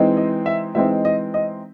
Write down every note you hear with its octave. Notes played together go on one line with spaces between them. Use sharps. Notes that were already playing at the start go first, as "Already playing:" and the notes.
Already playing: E3 G#3 C4 D#4
D#5
E5
E3 G#3 C4 D#4 E5
D#5
D#5